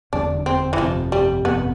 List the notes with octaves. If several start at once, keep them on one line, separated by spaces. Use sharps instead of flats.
F1 E2 D3 G3 D4
C4
E3
G1 F2 C3 F3
G3
G1 F2 C3 B3